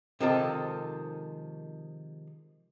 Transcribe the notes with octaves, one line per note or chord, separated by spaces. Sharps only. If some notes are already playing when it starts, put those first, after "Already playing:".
C3 D#3 F3 G#3 D#4 A4